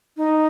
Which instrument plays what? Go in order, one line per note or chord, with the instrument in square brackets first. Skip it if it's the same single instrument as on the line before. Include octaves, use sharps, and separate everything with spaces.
[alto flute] D#4